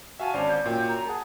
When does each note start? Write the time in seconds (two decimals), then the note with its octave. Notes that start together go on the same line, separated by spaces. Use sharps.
0.19 F#4 E5 F5 G#5 A5
0.34 G#1 C#4 D4 C5 F5
0.48 G6
0.65 F#2 A#2 G5
0.88 A#5
1.07 G#4 F#5 A5